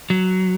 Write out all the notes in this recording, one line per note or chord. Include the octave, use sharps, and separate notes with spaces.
F#3